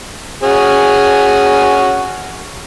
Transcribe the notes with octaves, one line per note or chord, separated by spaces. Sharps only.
C#4 F#4 G#4